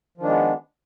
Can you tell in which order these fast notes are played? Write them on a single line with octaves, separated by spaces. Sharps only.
F3 D#3 D4 G#3 B3